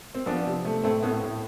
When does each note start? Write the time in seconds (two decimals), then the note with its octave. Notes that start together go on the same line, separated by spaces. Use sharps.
0.15 C4
0.26 F3 B3 D4
0.46 C3
0.65 A3
0.83 A2 A3 C4
1.03 A2 B3
1.22 A2